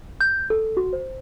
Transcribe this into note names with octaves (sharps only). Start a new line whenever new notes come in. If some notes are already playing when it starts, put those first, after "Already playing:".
G6
A4
F#4
C5